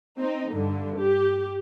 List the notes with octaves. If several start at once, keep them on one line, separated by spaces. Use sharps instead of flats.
C4 D#4
G2 D3
G4